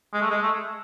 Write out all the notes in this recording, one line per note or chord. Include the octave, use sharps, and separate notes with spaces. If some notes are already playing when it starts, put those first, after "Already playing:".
G#3
A3
G#3
A3